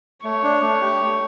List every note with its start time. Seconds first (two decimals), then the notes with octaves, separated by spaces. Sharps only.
0.24 A3 C#5
0.43 D4
0.62 A3
0.81 G4
1.00 A3